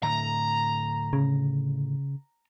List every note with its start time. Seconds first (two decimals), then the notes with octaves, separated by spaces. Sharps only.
0.03 A2 D3 A3 A#5
1.13 C#3